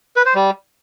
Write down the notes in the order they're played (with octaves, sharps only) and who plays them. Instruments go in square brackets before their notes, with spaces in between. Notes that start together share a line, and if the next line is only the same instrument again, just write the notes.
[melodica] B4
C5
G3